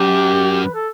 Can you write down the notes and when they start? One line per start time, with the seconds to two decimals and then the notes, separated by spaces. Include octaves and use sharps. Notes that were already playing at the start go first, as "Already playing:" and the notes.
Already playing: F#2 G4
0.64 B4
0.74 A4